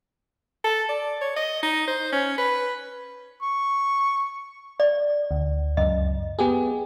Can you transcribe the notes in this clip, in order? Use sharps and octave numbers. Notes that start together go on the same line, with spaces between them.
A4
D5
C#5
D#5
D#4
C5
C#4
B4
C#6
D5
D2
C#2 F#2 D#5
B3 G4 G#4